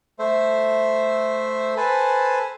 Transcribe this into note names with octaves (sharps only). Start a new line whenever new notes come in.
A3 C5 E5
A4 B4 C5 G#5 A5 B5